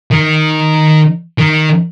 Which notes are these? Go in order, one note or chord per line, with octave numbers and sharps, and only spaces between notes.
D#3
D#3